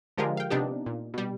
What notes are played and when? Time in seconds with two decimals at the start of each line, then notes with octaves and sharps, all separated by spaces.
0.17 D3 F3 G#3 F4 G4 A#4
0.37 F5 G5
0.50 C3 B3 D4 D#4 G4
0.86 A#2
1.14 B2 G3